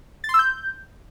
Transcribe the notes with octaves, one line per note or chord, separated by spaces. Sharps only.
A6
C6
E6
G6